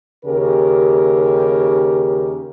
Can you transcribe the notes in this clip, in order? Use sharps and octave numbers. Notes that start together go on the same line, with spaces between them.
D#2 C#3 G4 A#4